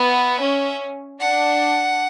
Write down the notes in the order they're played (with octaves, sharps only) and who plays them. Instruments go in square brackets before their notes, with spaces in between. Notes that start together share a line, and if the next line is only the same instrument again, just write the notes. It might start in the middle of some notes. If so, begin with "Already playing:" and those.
Already playing: [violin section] B3 [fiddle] E5
[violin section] C#4
[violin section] D4 [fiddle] F#5